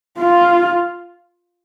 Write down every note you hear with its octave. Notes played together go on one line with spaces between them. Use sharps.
F4